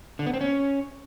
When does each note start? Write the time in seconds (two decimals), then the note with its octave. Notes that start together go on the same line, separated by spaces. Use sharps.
0.19 D3
0.26 B3
0.34 C4
0.41 C#4